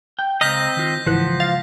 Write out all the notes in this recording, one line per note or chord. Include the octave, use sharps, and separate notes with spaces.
G5
C#2 C4 D#5 F5 A#5 G6 A#6 B6
D#3 F4
G#1 C#2 E3 F3 F#5
F5 A6